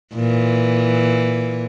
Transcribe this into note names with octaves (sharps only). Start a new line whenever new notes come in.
A#2 E3